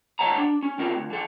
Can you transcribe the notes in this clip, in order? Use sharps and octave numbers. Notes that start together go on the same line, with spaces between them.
D#3 C#5 F#5 A5 A#5
D4
C#4
D#3 C4 F4 A#4
D2
E3 A4